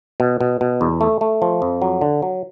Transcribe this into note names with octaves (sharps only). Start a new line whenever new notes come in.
B2
B2
B2
E2
A3
A3
F3
F2
F#3
D3
F#3